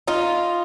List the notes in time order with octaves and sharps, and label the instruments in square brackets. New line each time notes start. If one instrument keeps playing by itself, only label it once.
[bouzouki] D#4 F4